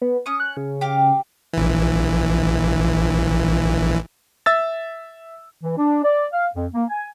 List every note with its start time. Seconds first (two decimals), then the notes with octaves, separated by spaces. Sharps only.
0.01 B3
0.26 C#4 C#6 D#6
0.40 F#6
0.57 C#3
0.81 G4 F5 D6
1.53 A#1 E3
4.46 E5 E6 A6
5.63 E3
5.77 D4
6.04 D5
6.33 F5
6.54 F2
6.74 A#3
6.89 G#5